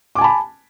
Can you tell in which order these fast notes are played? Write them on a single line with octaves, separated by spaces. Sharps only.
D6 G#5 A5 B5